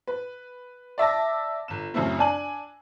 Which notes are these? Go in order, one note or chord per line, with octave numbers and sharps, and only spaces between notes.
B4
D5 E5 A5 A#6
G1 E7
F#2 C#3 A3 C4 E4
D4 G#5 F#7